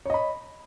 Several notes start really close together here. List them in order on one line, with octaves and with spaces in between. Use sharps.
C#5 D#5 B5